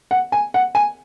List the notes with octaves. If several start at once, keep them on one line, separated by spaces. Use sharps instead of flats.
F#5
G#5
F#5
G#5